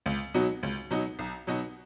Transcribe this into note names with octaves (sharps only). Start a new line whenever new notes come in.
C#2
B2 F#3 D#4 F#4
C#2
B2 F#3 D#4 F#4
B1
B2 F#3 D#4 F#4